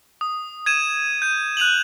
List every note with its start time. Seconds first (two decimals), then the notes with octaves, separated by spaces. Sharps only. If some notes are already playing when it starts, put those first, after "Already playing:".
0.21 D#6
0.66 G#6 D#7 E7
1.22 G6 D#7
1.57 F#6 D#7 F7 F#7